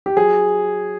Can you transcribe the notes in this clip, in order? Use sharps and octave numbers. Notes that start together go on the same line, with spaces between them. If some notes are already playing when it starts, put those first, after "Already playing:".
G4
F#3 G#4